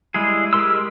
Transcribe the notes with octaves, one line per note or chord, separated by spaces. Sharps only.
G3 G#3 E4 G#4
G#3 G4 A#4 C6 E6